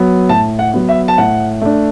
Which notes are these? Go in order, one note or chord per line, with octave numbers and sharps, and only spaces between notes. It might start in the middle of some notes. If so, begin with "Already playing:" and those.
Already playing: F#3 B3
A2 A5
F#5
F#3 B3
E5
A5
A2 F#5
A3 D4